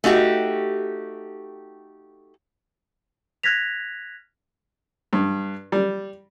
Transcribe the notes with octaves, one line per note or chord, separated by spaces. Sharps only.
A3 D#4 F#4 G4
F6 F#6 G#6 A#6 B6 F7
G2
G3